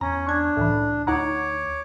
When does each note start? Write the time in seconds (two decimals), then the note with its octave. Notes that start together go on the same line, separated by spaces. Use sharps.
0.01 E2 C#4 A#5
0.27 D4 C#6 G#6
0.57 C2 A2 C#3 E3
1.07 D2 D#4 C#5 F#5 A#5 D6